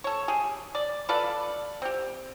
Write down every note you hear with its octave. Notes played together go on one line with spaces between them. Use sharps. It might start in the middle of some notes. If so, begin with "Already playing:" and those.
A4 C#5
G4 G#4
D5
F4 A4 B4 D5
C4 G4